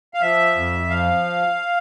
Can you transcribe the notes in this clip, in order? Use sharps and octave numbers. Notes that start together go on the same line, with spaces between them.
F5
F3 E5
F2
F3 F5